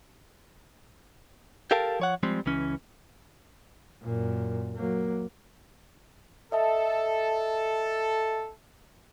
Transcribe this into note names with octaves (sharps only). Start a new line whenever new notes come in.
G4 A4 A#4 F5 G5 A5
F3 C#5 F#5
F3 G3 G#3 C4
C#2 E3 C#4
F#2 A#2
F#3 A#3
A4 D#5 E5 A5